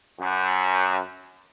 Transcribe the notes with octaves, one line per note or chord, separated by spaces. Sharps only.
F#2